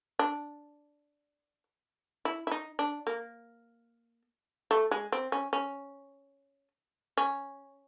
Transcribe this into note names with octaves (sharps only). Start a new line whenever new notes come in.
D4
E4
E4
D#4
D4
A#3
A3
G#3
C4
C#4
C#4
C#4